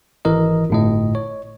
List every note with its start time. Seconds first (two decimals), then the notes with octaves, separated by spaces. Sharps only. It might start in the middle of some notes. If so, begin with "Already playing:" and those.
0.25 G#1 E3 A#4 D#5
0.70 G1 A2 D#5
1.15 C#5